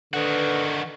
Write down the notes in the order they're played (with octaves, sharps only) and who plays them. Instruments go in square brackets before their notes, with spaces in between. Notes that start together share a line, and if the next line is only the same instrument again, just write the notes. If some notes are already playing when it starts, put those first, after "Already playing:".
[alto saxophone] D3 [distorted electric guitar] D#3 F#4 [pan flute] B4